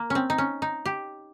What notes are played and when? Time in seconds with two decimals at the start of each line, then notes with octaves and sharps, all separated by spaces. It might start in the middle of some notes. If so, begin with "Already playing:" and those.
Already playing: A#3
0.10 C4 C#4
0.30 D#4
0.38 C#4
0.62 D#4
0.86 G4